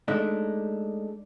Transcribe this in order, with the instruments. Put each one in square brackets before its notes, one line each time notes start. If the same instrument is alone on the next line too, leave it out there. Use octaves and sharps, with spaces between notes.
[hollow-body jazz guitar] G#3 A3 D4 D#4